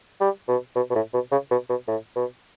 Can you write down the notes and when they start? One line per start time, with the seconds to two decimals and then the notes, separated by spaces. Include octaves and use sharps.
0.21 G3
0.48 B2
0.76 B2
0.90 B2
0.95 A2
1.14 B2
1.32 C#3
1.51 B2
1.69 B2
1.88 A2
2.16 B2